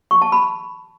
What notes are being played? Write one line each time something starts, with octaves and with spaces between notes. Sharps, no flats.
C#6
A5
B5